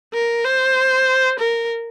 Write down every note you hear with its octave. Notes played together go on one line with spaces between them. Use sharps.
A#4
C5
A#4